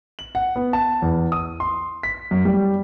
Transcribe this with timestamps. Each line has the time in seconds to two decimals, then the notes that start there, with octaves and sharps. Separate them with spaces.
0.19 F#7
0.35 F#5
0.56 B3
0.73 A5
1.02 E2
1.32 D#6
1.60 C6
2.03 B6
2.31 F#2
2.45 G3